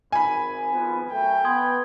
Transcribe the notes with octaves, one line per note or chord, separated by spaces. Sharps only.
G#1 G#5 B5
G#1 F3 B3
F#2 A3 G5
B3 C6 D#6 G#6